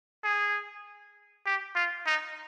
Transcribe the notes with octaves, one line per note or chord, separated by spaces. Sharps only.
G#4
G4
F4
D#4